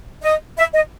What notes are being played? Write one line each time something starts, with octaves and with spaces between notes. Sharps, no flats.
D#5
E5
D#5